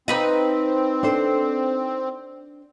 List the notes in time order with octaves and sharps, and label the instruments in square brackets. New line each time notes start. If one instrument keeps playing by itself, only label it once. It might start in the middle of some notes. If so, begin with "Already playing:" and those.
[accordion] C4 [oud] D#4 B4 D#5
[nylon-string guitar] D4 A4 C5